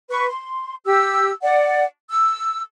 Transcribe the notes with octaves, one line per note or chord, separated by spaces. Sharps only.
B4 C#6
C6
G4 E6
D5 F#5
E6